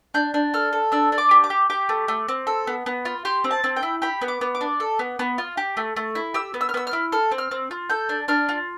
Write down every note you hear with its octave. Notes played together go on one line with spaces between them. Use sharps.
D4 G6
D4
A4 F6
A4
D4 E6
D4
D6
G4
D6
G4
G4 D6
A3
A3
C4
A4
B3
B3
F4
G4 C6
C4
A5
C4
G5
E4
G4 B5
B3
D6
B3
D6
D4
A4
B3
B3
F4
G4
A3
A3
E4
G4 E6
B3
E6
F6
B3 E6
F6
E4
A4 F6
C4
F6
C4
F4
A4 G6
D4
D4 F6
F4